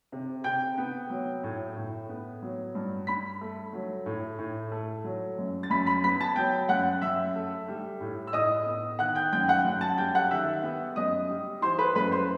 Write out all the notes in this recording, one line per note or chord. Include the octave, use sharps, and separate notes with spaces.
C3
C3 G5 G6
B3
F#3
A2
A2
B3
F#3
G2
G2 B5 B6
A3
F#3
A2
A2
A3
F#3
F#2
A6
F#2 B5 B6
B5 B6
B3 B5 B6
A5 A6
F#3 G5 G6
F#2 F#5 F#6
F#2 E5 E6
A3
G3
A2
E6
A2 D#5 D#6
B3
D#3 F#5 F#6
G5 G6
F#2 G5 G6
F#5 F#6
F#2
A5 A6
G3 G5 G6
F#5 F#6
D#3 E5 E6
B3
F#2 D#5 D#6
G3
E3 C5 C6
B4 B5
F#2 B4 B5
C5 C6